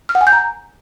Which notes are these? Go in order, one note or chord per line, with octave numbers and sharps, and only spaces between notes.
F6
F#5
G#5
G6
A#5